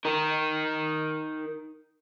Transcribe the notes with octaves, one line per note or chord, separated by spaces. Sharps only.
D#4 A#4